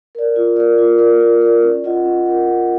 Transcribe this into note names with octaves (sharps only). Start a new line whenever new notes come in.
A#4 D5
F4
A#4 D5
F4
A#4 D5
F4
A#4 D5
C#4
F4 A#4 D#5 F#5
C#4
F4 A#4 D#5 F#5
C#4